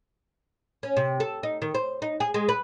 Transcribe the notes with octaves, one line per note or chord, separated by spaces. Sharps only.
C#4
C3
A4
D#4
D#3
C5
D#4
G#4
G#3
B4